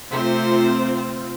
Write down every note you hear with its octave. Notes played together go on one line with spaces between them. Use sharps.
C3 A3 C4 F4 C5